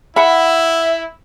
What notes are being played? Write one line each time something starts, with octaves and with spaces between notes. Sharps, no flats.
E4 E5 F#5 B5